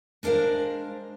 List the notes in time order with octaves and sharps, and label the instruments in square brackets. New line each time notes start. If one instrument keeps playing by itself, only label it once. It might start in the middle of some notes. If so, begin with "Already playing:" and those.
[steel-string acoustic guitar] G#3 D4 A#4 C5 F5